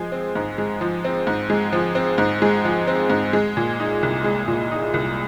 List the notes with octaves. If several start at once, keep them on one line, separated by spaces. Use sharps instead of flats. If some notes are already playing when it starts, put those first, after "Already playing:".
Already playing: F3 G#3
C4
G#2
G#3
F3
C4
G#2
G#3
F3
C4
G#2
G#3
F3
C4
G#2
G#3
A#2
D#4
C2
G#3
A#2
D#4
C2